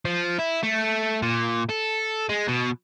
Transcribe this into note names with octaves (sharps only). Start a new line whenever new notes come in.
F3
E4
A3
A#2
A4
G#3
B2